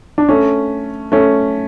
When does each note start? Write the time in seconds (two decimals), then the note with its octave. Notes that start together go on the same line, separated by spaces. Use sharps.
0.18 D4
0.29 A3 C#4
1.12 A3 C#4